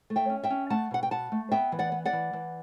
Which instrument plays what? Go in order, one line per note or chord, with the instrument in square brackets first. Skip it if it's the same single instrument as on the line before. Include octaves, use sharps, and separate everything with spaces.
[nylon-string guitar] A3
E5 G5
C#4
E5 G5
C#4
A3 F#5 A5
B2 F#5
G5
B2 F#5 A5
A3
B3 E5 G5
E3
D5 F#5
B3
D5 F#5
E3
E3